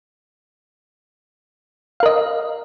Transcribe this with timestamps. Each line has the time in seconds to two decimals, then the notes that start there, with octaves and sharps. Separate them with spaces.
2.00 F5
2.03 A#4
2.06 D#5